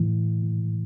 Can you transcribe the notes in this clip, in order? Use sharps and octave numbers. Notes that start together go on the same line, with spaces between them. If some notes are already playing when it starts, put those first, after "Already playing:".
Already playing: A2 E3